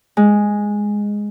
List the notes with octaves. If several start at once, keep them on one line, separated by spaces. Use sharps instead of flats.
G#3